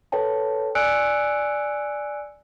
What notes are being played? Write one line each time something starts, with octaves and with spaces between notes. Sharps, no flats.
A4 B4 C#5 G5 A5
D5 G#5 E6 F#6 C#7 D7